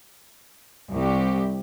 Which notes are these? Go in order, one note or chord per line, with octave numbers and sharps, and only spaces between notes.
C2 G4